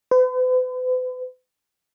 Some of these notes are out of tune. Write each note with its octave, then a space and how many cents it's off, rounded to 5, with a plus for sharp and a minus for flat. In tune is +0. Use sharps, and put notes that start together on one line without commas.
B4 +45